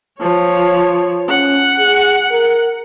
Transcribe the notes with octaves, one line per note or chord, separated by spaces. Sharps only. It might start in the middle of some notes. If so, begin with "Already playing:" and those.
F3 C#5
C#4 F#5
G#4
A#4